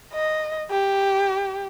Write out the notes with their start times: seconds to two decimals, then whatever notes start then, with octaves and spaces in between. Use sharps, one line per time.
0.12 D#5
0.71 G4